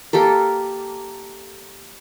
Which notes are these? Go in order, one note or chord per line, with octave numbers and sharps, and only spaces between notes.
A#3 G4 A4 A#4